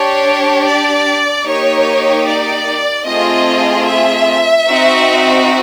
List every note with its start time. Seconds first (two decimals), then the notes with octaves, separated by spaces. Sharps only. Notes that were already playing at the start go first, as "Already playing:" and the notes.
Already playing: D4 G4 C#5
0.66 D5
1.46 A#3 D#4 G4 C#5
2.27 D5
3.06 A3 C4 F4 G#4 D#5
3.87 E5
4.67 C4 D#4 F#4